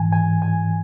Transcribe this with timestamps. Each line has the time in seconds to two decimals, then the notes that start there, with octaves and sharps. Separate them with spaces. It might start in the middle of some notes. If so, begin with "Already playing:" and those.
Already playing: G#2 E3 G#5
0.12 G#5
0.42 G#5